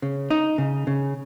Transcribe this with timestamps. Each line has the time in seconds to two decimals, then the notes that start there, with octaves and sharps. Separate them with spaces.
0.02 C#3
0.30 D#4
0.58 C#3
0.87 C#3